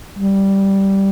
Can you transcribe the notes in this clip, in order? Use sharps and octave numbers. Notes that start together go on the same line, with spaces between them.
G3